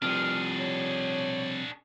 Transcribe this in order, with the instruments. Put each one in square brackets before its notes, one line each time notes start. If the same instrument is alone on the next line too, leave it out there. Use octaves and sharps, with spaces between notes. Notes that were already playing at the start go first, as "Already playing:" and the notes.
[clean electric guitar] C3 F3 G3 [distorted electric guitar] D4 G#4 [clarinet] F6
[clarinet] C#5